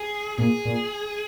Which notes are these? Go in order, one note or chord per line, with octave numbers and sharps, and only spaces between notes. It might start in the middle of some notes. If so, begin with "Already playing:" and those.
Already playing: G#4
A#2 G#4
A#2